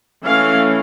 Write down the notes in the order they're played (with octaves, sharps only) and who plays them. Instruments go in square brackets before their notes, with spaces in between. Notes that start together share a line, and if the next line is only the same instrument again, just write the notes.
[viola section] E3 A3 C#4 F5